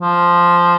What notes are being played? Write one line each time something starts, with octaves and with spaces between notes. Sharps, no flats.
F3